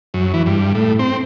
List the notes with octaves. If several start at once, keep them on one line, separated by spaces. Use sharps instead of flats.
F#2
E3
G2
A2
C4